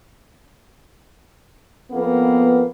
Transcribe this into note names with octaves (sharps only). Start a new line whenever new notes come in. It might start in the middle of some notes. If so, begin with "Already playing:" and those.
F2 A#3 B3